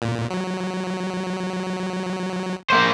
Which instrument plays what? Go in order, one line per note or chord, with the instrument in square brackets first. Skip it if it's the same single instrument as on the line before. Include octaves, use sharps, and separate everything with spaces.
[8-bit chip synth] A#2
F#3
[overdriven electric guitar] A#3 C5